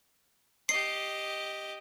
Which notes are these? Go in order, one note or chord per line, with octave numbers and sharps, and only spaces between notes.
G4 D#5 C7